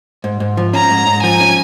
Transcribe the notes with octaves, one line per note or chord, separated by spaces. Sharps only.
G#2
G#2
F3
C#4 A#5
G#2
G#2
F3 G#5
C#4